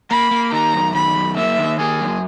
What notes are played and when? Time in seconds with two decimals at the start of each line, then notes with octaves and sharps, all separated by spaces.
0.11 A#3 B5
0.31 A#3
0.52 D#3 A#5
0.73 F#2
0.94 D#3 B5
1.15 F#2
1.36 A#3 E5
1.58 D#3
1.79 A#3 G#4
2.01 F#2